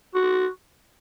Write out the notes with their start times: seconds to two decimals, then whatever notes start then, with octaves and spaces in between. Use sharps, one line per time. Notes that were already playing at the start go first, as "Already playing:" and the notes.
0.15 F#4